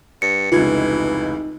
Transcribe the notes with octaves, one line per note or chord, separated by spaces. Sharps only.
G2 C#7
F1 C#2 E3 D#4 F4 G#6